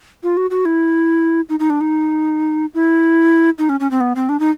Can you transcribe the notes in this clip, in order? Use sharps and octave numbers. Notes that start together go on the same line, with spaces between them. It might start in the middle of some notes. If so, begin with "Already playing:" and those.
F4
F#4
F#4
E4
D#4
D#4
D4
D#4
E4
D#4
C#4
C#4
C4
B3
C4
D4
D#4